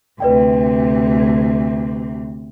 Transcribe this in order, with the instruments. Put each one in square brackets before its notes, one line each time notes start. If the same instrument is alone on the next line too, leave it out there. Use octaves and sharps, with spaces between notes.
[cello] D2 C3 [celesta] B4 D5 G5